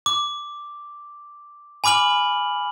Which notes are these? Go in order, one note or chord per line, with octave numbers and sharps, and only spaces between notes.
D6
G#5 B5 D6 F6 F#7